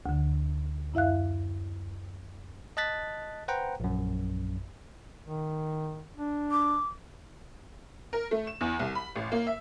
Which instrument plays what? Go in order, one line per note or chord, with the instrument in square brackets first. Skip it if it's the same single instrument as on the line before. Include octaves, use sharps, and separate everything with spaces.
[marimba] D2 D3
F#2 E4 E5 F5 F#6
[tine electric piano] D#5 A5 F#6 A6 B6
B4 C5 F#5 G5 A#5
A#1 F#2
[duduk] D#3
D4
[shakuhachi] D6
[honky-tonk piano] A#4
A3
E7
E2
C2
B5
A1
A#3
E5